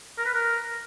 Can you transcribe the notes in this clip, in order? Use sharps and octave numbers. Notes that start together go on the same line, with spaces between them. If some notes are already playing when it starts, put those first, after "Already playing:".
A#4
B4
A#4